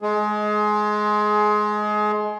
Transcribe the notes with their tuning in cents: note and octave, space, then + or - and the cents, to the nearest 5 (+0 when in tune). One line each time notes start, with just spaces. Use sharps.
G#3 +20 G#4 +25